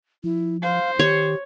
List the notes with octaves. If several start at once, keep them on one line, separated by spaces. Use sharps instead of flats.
F3 E4
C5 F5
D#3 G4 C#5